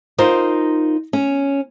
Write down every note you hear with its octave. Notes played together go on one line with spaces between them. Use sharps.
D#4 F4 A#4 C5
C#4